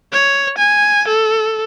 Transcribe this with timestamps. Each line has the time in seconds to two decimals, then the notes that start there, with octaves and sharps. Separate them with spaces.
0.13 C#5
0.58 G#5
1.08 A4